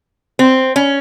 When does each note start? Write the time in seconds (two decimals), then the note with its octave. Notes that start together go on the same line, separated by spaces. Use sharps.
0.39 C4
0.76 C#4